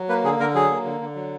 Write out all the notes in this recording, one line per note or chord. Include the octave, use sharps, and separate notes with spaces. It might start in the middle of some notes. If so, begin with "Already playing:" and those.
Already playing: F#3
A#3 B4
D3 G#4
D3 A#4
F#3 G#4
A#3
D3
D3
F#3